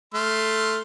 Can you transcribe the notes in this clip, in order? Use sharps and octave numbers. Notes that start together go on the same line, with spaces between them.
A3 C6 F6